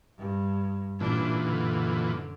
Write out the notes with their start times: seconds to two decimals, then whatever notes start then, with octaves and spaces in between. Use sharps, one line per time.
0.18 G2
1.00 A1 A#2 E3 D4
1.39 F#2 D3